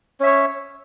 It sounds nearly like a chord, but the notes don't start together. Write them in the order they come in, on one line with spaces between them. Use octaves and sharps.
C#4 E5 C#5